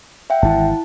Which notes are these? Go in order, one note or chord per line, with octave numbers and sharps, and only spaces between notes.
E5 F#5 G5
G#1 E3 E4 A5